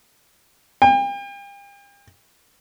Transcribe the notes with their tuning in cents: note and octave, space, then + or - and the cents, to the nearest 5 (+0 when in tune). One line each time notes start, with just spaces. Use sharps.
G5 +40